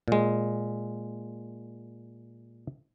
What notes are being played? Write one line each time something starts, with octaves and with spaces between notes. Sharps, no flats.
A#2 G#3